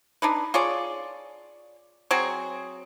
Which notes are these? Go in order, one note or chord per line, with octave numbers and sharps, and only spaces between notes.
D4 D#4 B4
F4 G#4 C#5 D5
F#3 C4 F#4 G#4